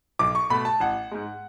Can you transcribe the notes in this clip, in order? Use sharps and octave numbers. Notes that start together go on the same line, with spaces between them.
B1 D6
C#6
B2 A3 B5
A5
A1 F#5
G#2 G#3